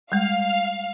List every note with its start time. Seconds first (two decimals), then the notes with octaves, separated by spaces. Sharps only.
0.12 G3 G#3 F5